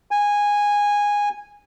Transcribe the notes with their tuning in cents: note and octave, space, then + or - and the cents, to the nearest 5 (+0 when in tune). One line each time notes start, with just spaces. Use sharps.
G#5 -15